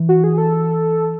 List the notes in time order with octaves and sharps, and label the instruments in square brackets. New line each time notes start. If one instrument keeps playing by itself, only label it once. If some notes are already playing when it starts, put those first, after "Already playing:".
Already playing: [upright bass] E3
[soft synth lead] F#4
G#4
A4